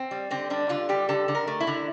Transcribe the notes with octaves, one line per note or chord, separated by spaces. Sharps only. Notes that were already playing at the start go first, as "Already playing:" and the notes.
Already playing: C4
G3
D3 C4
G3 D4
D3 F4
G3 G4
D3 A4
D3
A#4
A3
E4
D3